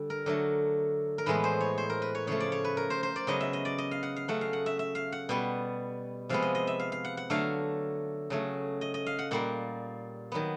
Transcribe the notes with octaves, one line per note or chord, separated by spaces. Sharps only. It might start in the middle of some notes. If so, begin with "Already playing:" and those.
Already playing: D3 G3
A#4
D3 F#3 A3
A#4
A2 E3 G#3 B3 B4
C5
C#5
C5
A#4
B4
C#5
C#3 F3 A3 C#5
D5
C#5
B4
A#4
C5
C5
D5
C#3 F#3 B3 D#5
E5
D#5
D5
D#5
F5
F#5
F5
C#3 F#3 A3 F#5
F5
F#5
E5
E5
F5
F#5
B2 G3 B3
C3 F3 G#3 B3 F5
D#5
D#5
E5
F5
F5
F#5
F#5
D3 F#3 A3 F5
C#3 F#3 A3
D#5
D#5
F5
F#5
A#2 G3 A#3 F#5
D#3 F#3 B3